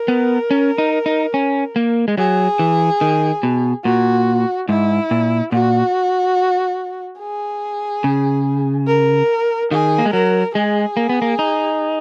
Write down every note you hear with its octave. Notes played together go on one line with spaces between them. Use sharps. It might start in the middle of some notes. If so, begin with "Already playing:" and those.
Already playing: A#4
B3
C#4
D#4
D#4
C#4
A#3
G#3
F#3 G#4
E3
D#3
B2
A#2 F#4
G#2 E4
A#2
A#2 F#4
G#4
C#3
A#4
D#3 G#4
A#3
G#3
F#3 A#4
G#3 G#4
A#3
B3
A#3
D#4